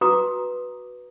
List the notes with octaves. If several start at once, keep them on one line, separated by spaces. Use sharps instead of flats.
F#4 B4 A#5 D6 D#6